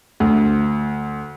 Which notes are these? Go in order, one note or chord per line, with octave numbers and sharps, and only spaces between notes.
D2